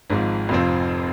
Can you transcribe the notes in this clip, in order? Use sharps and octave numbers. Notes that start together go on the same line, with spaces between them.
G#1 G#2 F3
F1 F2 F3 C4